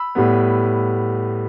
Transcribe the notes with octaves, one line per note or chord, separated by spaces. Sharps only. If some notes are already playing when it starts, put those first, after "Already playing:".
Already playing: B5 E6
A2 G3 B3